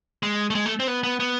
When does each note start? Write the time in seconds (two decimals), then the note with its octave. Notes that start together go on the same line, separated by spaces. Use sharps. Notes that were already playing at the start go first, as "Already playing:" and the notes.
0.23 G#3
0.50 A3
0.55 G#3
0.66 A3
0.80 C4
0.88 B3
1.03 B3
1.20 B3